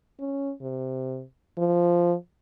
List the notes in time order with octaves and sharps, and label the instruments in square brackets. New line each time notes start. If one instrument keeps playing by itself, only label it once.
[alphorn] C#4
C3
F3